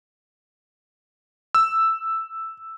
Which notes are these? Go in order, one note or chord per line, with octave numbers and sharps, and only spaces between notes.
E6